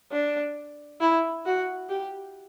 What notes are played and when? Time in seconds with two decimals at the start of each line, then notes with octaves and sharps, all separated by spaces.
0.12 D4
1.01 E4
1.45 F#4
1.89 G4